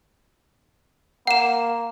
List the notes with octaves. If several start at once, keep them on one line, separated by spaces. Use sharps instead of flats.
A#3 F#5 E7